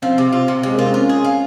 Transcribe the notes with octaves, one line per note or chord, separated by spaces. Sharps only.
F3 C4
C3
F4
C3
C3 G#3
A#3 F4
C4
C#4 F4
G#4
F4